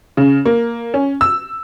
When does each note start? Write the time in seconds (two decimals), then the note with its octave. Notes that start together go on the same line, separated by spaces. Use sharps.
0.17 C#3
0.46 A#3
0.94 C#4
1.21 E6